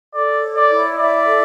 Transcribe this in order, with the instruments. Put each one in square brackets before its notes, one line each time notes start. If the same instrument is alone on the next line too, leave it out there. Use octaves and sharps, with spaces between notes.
[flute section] A4 [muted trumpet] D5
[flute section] C#5
[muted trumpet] D5
[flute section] E4
[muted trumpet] D5 [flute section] E5
[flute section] A4